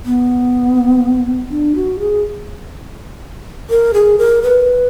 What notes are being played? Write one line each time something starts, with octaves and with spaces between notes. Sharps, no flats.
B3
D4
F#4
G#4
A#4
G#4
A#4
B4